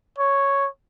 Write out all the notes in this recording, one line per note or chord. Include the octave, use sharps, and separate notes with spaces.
C#5